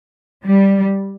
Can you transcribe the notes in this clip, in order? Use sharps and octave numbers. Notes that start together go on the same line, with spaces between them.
G3